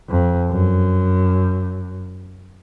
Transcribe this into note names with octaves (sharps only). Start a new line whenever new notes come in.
F2
F#2